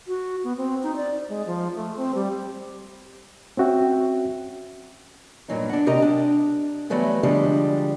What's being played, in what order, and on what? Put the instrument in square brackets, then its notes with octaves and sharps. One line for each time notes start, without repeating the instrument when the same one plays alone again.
[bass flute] F#4
B3
C4
D#4
D5
G#3
F3
A3
C4
G3
[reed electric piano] C4 C#4 F#4 E5 G5
[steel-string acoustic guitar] G2 A#2 F#3 D#4
D4 F#5
D2 C3 G4 A#4 D#5 A#5
D4
E3 F#3 G3 A3 B3 C#4
D3 F3 G3 G#3 D4 G4